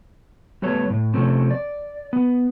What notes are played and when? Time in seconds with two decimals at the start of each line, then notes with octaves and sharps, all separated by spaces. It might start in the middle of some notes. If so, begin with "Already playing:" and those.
0.62 G3 A3 B3 A4 C#5
0.90 A2
1.14 C3 F3 A3 C4 C#4
1.51 D5
2.13 B3